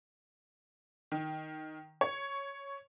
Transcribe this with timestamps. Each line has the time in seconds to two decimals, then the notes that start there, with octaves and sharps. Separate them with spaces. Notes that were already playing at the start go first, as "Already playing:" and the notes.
1.12 D#3
2.01 C#5